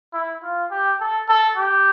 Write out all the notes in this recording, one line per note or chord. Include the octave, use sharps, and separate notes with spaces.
E4
F4
G4
A4
A4
G4